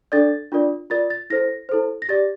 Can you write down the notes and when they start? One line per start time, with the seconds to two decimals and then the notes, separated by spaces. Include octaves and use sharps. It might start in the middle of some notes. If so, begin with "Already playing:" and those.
0.12 D4 A4 D5 A6
0.52 D4 F4 A#4 D5
0.90 F4 A#4 D5 A6
1.10 A6
1.30 E4 A4 C5 A#6
1.69 E4 A4 C5
2.02 A#6
2.09 G4 D5 A6